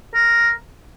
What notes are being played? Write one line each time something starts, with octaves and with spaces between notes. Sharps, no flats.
A#4